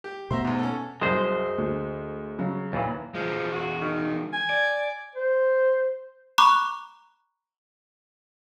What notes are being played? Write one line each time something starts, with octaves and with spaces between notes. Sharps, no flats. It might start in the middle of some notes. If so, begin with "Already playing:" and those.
G4
B2 A3 B3 C5 E5 A#5
E2 G#2
C#4 A4
C2 F#2 G#3 C5
D2
C#3 F#3
D#2 A#2 E3
E3 F3 G#3
F#4
D#3
G#5
D5
C5
A#5 B5 C#6 D6 F#6